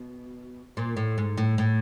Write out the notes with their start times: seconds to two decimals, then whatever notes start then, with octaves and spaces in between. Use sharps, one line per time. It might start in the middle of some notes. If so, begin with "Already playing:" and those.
Already playing: B2
0.77 A#2
0.97 A2
1.18 G#2
1.38 A2
1.58 A2